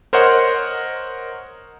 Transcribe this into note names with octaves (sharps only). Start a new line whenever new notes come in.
A#4 C5 C#5 D#5 F#5